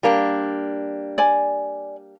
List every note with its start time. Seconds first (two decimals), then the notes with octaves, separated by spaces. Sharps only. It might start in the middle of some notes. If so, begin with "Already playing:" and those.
0.03 G3 A#3 D4
1.18 D5 G#5